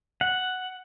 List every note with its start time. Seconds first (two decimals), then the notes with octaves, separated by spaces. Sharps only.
0.21 F#5